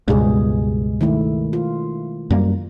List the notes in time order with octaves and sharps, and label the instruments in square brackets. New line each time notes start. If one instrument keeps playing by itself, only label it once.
[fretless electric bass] C#2 G2 [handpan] B2 G#3 G#4
[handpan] D#3 A3 E4
F4
[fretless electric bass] F#2 G3 A#3